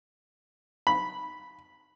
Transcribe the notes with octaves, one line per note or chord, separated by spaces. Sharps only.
B5